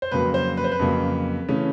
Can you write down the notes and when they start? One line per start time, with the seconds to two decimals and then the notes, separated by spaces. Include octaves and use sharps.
0.02 C5
0.11 F2 C#3 F#3 A#3 B4
0.34 C5
0.57 B4
0.64 C5
0.72 B4
0.79 F2 C#3 F#3 A#3
1.49 C#3 E3 A3 C#4